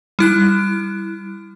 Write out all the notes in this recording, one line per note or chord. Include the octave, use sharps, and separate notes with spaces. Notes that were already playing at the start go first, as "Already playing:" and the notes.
G3 E4 F#6